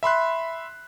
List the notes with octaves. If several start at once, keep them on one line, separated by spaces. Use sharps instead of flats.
E5 B5 C6 F#6